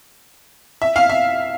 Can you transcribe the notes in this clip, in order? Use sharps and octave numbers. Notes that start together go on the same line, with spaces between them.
E5
F5
E5